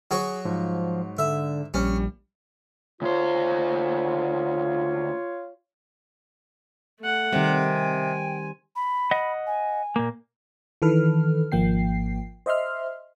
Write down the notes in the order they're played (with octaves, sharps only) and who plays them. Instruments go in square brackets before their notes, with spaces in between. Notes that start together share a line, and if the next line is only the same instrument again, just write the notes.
[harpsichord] F#3 F#4 C#6 [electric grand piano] G#4
[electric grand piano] G#2 [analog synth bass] F3
[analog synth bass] D3 [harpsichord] E5
[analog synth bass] A#1 [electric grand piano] G3 [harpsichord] C#4
[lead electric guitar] D2 C5 [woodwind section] F4 C#5
[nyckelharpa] A3 F#5
[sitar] C3 [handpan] D#3 G3 [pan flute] G5
[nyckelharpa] G#5
[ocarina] B5
[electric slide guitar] D#5 F#5
[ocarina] G#5
[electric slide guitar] A#2 A#3
[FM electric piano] D#3 E3 A4 B4 F6
G#1 F3 A#3 G5 C7
C5 D#5 E5 C6 F6